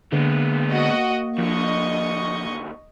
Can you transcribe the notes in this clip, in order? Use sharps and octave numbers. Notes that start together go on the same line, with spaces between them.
D3 G#3 A#3 B3
F#4 D#5
D#2 D3 F3 D#5 C#6